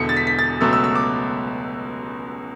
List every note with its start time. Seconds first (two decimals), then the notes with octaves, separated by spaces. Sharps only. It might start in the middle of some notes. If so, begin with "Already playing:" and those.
Already playing: E1 E2 D3 C#7
0.09 A6
0.17 B6
0.27 B6
0.39 A6
0.61 C#2 B2 F#3 A3 E6
0.73 E6
0.84 E6
0.95 D6